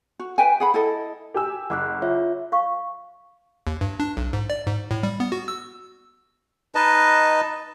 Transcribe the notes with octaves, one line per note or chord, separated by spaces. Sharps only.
F#4
B4 E5 G5 G#5
G#4 F#5 B5
E4 A4 D#5
G4 G#5 E6
F#1 F#5 D6 F#6
F4 C#5 E5
F5 C#6
D#2
G2
D4
B1
G#2
D5
G#2
A2
G3
B3
F#4
E6
D#4 B4 D#5 A5